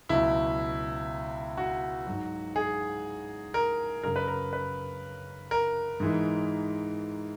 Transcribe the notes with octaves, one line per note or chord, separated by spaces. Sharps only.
C#2 B2 F#3 E4
F#4
G#2 F#3
G#4
A#4
F#2 C#3 F#3 A#4
B4
A#4
B4
A#4
G#2 E3 G#3